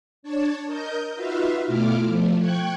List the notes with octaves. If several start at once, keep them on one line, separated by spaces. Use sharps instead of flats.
D4 C#5 A5
A#4 D#5 G6
D#4 F4 F#4 B4 E5 F5
B2 A3 E4 F4 D6 F6
F3 A3
G5 C#6 F#6 G#6